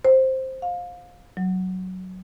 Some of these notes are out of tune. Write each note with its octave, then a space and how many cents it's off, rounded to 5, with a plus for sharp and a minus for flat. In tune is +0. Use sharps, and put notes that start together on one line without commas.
C5 +5
F5 +25
F#3 +5